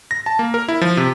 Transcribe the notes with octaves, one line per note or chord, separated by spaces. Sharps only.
A#6
A5
A#3
A#4
E4
F3
C3